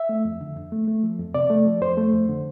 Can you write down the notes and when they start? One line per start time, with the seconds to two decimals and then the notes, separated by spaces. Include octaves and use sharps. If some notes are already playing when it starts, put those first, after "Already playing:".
Already playing: E5
0.09 A3
0.25 F2
0.41 D3
0.56 F2
0.72 A3
0.88 A3
1.03 F3
1.19 F2
1.34 C3 D5
1.50 A3
1.66 F3
1.81 F2 C5
1.97 A3
2.13 F2
2.29 D3